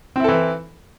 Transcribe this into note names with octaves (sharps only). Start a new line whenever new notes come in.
E3 C4 E4 A4